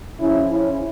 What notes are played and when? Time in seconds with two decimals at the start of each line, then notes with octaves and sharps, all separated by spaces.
0.20 C#3 F3 C#4 E4
0.48 C#4 E4